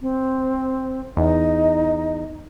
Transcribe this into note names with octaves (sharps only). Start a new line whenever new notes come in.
C4
E2 D#4 D#5